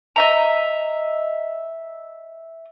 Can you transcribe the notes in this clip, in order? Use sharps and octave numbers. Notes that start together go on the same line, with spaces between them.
D#5 E5 A#5